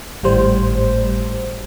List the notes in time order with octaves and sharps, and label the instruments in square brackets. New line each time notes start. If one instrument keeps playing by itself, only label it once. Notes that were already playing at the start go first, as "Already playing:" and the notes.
[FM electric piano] G#1 A2 G3 C5